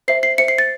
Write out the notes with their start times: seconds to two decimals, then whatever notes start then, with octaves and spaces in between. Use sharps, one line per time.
0.08 C5 E5 C7
0.23 C7
0.38 C5 E5 C#7
0.48 C7
0.58 A6